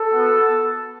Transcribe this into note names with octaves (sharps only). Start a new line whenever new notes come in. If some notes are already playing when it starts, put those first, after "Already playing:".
Already playing: A4
B3 F#4